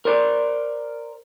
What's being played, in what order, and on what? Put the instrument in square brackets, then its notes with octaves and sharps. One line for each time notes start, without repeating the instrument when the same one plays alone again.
[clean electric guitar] A#4 C5 D5